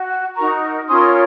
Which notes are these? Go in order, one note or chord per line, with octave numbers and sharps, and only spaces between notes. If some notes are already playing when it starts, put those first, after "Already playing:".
Already playing: F#4
D#4 F#4 A#4 A#5 C#6
C#4 F4 A#4 C#5 C6 D#6